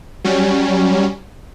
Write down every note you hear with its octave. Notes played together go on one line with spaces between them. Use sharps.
F#3 G3 C#4